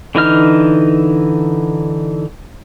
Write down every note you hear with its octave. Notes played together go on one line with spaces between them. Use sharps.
D3 E3 D#4 F6